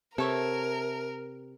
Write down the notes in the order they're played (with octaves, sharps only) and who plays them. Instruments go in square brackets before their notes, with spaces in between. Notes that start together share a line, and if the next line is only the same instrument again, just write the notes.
[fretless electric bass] C3 [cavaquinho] A4 C#5 E5 [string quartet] A#4